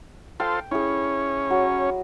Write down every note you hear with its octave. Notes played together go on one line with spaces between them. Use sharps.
F4 A4 C5 G5
C#4 E4 G#4
F#3